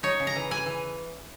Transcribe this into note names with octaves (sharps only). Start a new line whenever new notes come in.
D#4 C#5
C#3
A#5
E3
E3 G#5
E3